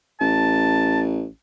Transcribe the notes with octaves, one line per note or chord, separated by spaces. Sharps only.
A1 A5